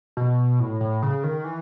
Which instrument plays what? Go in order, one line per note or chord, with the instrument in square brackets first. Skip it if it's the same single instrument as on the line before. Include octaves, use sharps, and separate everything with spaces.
[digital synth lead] B2
A2
A2
C#3
D#3
E3